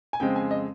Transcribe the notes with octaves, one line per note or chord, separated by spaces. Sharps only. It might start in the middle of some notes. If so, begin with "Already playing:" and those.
G#5
F2 C#3 G#3 C4 G5
G#5
D#5